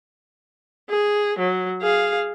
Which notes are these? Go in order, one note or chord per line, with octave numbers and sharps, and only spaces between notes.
G#4
F#3
G#4 F5